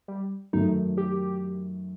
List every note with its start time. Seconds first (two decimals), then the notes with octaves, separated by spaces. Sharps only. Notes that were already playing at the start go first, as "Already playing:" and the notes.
0.08 G3
0.53 F#2 D#3 A3 D#4
0.97 G4